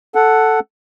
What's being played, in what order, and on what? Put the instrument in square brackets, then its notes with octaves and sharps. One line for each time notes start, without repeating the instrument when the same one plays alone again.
[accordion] A4 F#5